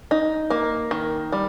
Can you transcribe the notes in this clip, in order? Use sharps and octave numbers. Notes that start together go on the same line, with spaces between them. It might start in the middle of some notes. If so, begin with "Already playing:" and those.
D#4
A#3
D#3
G3